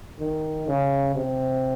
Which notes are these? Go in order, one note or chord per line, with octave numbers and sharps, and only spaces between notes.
D#3
C#3
C3